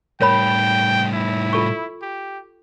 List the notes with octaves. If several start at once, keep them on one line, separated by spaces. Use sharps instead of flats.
A2 G3 A#4 C#5 G5 B5
E4
F4 A4 C#6
G4